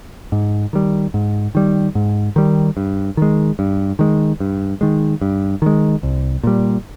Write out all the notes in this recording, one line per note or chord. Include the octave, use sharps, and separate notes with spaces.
G#2
D#3 G3
G#2
D#3 G3
G#2
D#3 G3
G2
D#3 G#3
G2
D#3 G#3
G2
D#3 G#3
G2
D#3 G#3
C2
A#2 G3